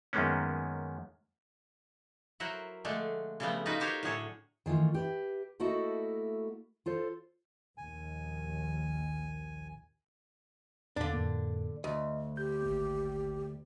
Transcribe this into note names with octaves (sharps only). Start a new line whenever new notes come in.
F#2 D#3 G#3 A#3 B3 C#4
F#3 E4 A#4 C5 E5 F#5
D3 F3 G#3 A3 D4
C#3 F3 G3 A3 B3 C4
D#4 F4 F#4 A#4 B4
F#4 G4 C5 C#5 F5
A2 D3 F#3 G#4 A4 C#5
D#3 E3 A3 F4
G4 B4 E5
A3 A#3 E4 F#4 A4 D#5
F4 A4 C5
A#1 D#2 G#5
E2 A#2 D3 D4 F5
F2 A2 A#3
D2 D#5
G4 G6
G#1 A#3